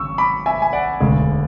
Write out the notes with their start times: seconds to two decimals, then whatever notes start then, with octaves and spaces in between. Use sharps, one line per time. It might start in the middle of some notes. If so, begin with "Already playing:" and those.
Already playing: G#1 C#3 F#3 C#6 E6
0.18 B5 D6
0.46 E5 G#5
0.62 G#5
0.73 D5 F#5
1.00 E1 D2 C#3 G#3